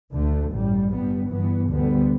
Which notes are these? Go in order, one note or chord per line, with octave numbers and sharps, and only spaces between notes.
D2 D3 A3
A1 G2 G3
G1 G2 G3 B3
G2 E3 B3
D2 D3 G3 B3